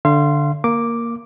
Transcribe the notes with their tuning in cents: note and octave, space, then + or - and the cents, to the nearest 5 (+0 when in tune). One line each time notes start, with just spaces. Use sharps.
D3 +0 F5 -40 C6 +0
A#3 +0 D6 +0